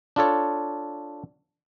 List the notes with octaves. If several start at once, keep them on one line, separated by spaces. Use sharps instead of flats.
D4 F4 A4 C#5